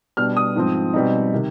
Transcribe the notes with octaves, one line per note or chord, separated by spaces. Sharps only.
B2 G3 B3 D4 F6
D#6
G#2 F3 C4
B2 G3 C4 D#4
C3 D#3